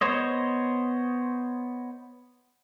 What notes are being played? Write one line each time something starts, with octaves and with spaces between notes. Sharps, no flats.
B3 C5 C#5 D#5